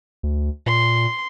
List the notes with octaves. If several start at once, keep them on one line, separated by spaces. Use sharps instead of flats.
D2
A#2 C6